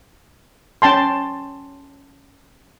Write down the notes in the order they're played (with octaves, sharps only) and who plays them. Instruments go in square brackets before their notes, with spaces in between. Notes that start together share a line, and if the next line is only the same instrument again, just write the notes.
[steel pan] C#4 G5 A5 C6